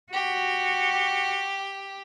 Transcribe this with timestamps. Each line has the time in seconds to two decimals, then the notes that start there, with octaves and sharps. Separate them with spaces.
0.13 F#4 G4